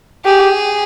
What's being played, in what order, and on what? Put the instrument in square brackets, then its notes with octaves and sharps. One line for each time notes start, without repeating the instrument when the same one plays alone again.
[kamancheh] G4 [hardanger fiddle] G#4